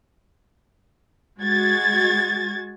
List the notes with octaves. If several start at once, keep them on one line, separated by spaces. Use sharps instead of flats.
G#3 F#4 G#6 A6